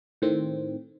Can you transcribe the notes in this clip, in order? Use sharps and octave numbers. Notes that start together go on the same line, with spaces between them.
A2 D#3 C4